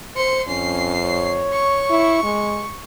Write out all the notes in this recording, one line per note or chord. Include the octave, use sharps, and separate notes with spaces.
C5 C6 C#7
F2 C#4 C7
C#5
C#6
E4
G#3